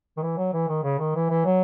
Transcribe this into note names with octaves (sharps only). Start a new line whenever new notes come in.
D#3
E3
F#3
E3
D#3
C#3
D#3
E3
E3
F#3